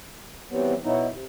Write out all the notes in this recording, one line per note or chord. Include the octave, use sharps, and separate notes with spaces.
E3 F#3 G3 B3 C4
B2 F#3 B3 D#4 E4
C3